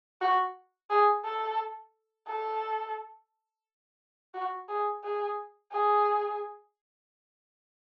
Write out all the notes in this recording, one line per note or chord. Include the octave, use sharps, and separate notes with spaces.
F#4
G#4
A4
A4
F#4
G#4
G#4
G#4